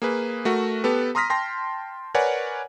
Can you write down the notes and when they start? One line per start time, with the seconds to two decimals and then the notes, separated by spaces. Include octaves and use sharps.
0.02 A#3 G#4 B4
0.45 A3 F#4 A#4
0.84 B3 G4 A4 B4
1.15 A#5 C6 D#6 F6 A#6 B6
1.30 G5 A5 C6 A#6
2.14 A#4 B4 C#5 D5 F#5 G#5